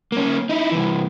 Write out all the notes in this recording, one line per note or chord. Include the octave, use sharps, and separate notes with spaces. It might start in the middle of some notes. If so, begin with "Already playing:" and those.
A#3 C#4
D#4 E4
C2 E3